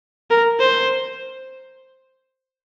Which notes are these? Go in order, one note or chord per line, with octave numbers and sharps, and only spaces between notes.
A#4
C5